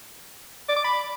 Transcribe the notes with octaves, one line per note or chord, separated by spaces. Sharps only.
D5
D6
B5